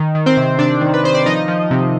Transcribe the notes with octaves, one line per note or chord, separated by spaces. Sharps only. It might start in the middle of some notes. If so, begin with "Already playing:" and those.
Already playing: D#3
D#3
C4 C5
C3
C3 D4 D5
D#3
B4
D#3 C5
D5
F3 D#4 D#5
F3
C3